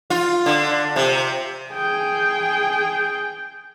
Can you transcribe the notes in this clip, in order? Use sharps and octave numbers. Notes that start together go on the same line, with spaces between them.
F4
D3
C3
G#4 G5